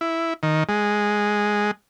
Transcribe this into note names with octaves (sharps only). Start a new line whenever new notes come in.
E4
D#3
G#3